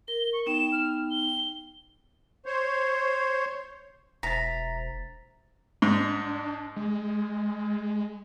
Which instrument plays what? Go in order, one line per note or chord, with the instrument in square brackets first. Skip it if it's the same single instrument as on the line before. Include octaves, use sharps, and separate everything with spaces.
[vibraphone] A#4 [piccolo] G7
[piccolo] C#6
[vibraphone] B3 D#4 G5 [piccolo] E7
[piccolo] F6
G7
[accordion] C5 C#5
[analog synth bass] E1 [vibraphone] C5 E5 [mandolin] A#5 [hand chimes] A6 B6
[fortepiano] G#2 [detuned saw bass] D4
[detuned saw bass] G#3